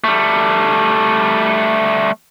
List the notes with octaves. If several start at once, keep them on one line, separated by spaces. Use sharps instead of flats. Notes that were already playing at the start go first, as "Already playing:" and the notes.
G3 A3